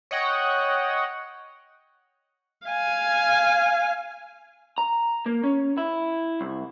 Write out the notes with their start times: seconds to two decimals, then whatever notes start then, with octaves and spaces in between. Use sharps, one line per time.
0.11 C#5 D#5 F#5 G5
2.67 F5 G#5
4.78 A#5
5.26 A#3
5.44 C#4
5.78 E4
6.41 C2